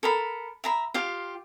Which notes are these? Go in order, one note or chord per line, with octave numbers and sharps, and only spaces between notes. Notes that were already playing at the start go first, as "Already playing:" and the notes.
A4 A#4 B5
E5 A#5 B5
F4 G4 F5